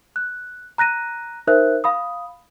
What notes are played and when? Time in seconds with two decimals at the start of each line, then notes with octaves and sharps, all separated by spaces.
0.16 F#6
0.78 A#5 F#6 A#6 D#7
1.47 D#4 A#4 C5 E5 F#6
1.84 F5 B5 D#6